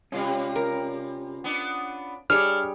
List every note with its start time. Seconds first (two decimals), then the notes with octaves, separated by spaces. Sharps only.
0.12 C3 G3 C#4 F4
0.56 A#4
1.44 B3 D4
2.30 G3 D4 G#4 C#5 F6